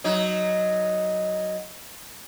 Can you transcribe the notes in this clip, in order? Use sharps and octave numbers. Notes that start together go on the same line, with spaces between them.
F#3 D#4